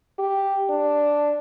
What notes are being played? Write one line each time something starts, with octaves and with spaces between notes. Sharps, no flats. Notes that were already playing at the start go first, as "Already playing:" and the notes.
G4
D4